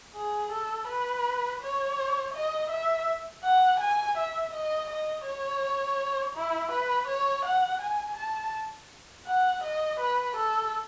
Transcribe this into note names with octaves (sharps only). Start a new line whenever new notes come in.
G#4
A4
B4
C#5
D#5
E5
F#5
G#5
E5
D#5
D#5
C#5
E4
B4
C#5
F#5
G#5
A5
F#5
D#5
B4
A4